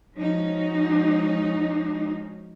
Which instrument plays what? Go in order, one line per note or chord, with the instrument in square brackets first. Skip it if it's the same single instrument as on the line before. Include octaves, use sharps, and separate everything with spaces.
[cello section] F3 G#3 C#4 D#4 F#4